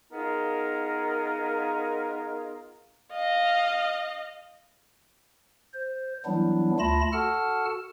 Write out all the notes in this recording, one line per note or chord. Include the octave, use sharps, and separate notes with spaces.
B3 D#4 F4 G#4 A#4
D#5 F5
C5
E3 F#3 G3 B3 D4 E4
D2 A3 F4 A5 B5 A#6
F#4 A4 F#5 A5 F6